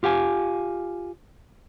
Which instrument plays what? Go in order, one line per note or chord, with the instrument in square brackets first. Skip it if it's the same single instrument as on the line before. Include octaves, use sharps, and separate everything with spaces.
[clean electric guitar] F4 G4 F5 G#5